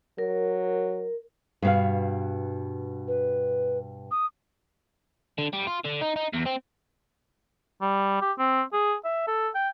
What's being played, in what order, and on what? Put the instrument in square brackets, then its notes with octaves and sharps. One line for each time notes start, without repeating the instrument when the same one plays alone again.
[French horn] F#3 [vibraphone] A#4
[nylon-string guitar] G2 B2 F5
[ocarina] B4
D#6
[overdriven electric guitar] D3
G3
F4
D3
D#4
D#4
E2
C4
[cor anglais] G3
G4
C4
G#4
E5
A4
G5